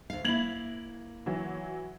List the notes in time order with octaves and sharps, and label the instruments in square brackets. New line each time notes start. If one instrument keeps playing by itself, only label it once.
[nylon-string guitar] D2 F5
[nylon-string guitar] A#3 E4 [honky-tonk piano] G#6 F#7
[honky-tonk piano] E3 F#3